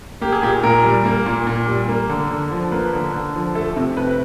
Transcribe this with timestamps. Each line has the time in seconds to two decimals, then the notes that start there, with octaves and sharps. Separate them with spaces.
0.21 A#3 G4
0.32 G#4
0.43 A#2 G4
0.63 A#2 A#4
0.84 G3
1.05 A#3
1.26 A#2
1.47 A#2
1.68 G3
1.88 A#3
2.10 D3
2.30 D3
2.51 F3
2.72 A#3 B4
2.93 D3
3.14 D3
3.35 F3
3.55 A3 A4
3.76 C3
3.97 C3 B4